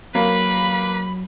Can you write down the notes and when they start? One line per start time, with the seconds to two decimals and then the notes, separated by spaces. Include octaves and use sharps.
0.15 F#3 A#3 B4 B5